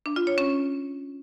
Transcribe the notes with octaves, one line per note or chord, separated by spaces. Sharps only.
D4
F4
C#5
C#4